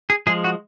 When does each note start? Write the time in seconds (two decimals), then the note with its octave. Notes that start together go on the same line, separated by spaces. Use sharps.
0.10 G#4
0.27 F3 G#3 G#4
0.44 F#4